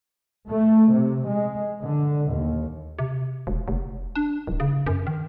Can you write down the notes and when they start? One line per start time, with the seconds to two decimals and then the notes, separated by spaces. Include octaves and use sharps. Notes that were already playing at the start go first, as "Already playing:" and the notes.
0.49 A3
0.92 C3
1.29 G#3
1.81 D3
2.31 D#2
2.99 C3
3.47 E1
3.68 F1
4.15 D4
4.47 D1
4.60 C#3
4.86 F#2
5.07 D#3